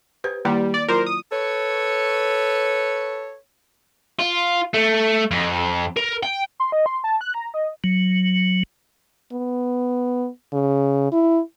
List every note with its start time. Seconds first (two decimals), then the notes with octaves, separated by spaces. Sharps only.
0.24 G4 B4 C5
0.45 D#3 G3 A#3 E4
0.74 D5
0.88 F#3 E4 F4 A#4 C5
1.06 D#6
1.32 A4 B4 C#5
4.19 F4
4.74 A3
5.31 F2
5.97 A#4
6.23 G5
6.60 C6
6.72 D#5
6.86 C6
7.04 A5
7.21 F#6
7.34 A#5
7.54 D#5
7.84 F#3
9.33 B3
10.53 C#3
11.12 E4